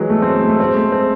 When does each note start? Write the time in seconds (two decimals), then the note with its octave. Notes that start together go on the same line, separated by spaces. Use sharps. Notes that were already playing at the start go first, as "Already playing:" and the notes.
Already playing: E3 F#3 G#3
0.10 A3
0.22 C4
0.35 A3
0.48 A3
0.60 C4
0.68 G#3
0.76 A3
0.92 C4